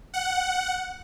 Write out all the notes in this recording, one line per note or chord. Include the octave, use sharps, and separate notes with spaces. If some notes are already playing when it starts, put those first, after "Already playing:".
F#5